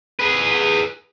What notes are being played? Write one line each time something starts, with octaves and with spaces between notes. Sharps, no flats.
G#4 B4